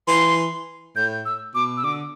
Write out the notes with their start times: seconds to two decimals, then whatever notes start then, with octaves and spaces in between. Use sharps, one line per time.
0.08 E3 C6
0.96 A2 G6
1.25 E6
1.55 B2 D6
1.77 E6
1.84 D3 D6